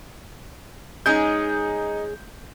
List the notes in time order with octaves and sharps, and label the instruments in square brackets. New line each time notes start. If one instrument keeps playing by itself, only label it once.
[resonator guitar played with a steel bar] G#3 C#4 G#4 [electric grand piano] D#4 G6